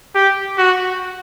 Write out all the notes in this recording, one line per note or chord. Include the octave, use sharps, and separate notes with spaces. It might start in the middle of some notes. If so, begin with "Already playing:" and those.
G4
F#4